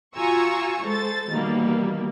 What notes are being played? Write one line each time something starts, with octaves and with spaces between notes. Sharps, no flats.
F4 F#4 G#5 A#5 C#6 E6
G#3 A4 C5 A6
B2 D#3 E3 G3 A#3